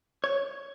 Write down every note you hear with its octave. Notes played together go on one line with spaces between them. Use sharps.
C#5